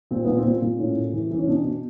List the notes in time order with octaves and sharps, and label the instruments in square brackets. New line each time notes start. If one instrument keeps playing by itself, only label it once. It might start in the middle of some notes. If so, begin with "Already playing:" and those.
[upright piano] A#2 C4
A#2 B3
C4
A#2
A#2
A2 C#4
A2
E3
E3
C#4
B2 D4
B2